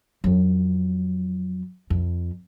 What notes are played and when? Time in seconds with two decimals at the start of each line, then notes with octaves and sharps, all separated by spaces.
0.24 F2 F#3
1.90 F2